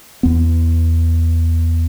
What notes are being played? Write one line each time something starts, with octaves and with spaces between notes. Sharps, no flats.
E2 B3